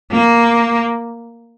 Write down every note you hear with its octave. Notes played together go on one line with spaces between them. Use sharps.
A#3